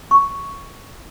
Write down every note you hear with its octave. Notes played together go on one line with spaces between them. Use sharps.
C#6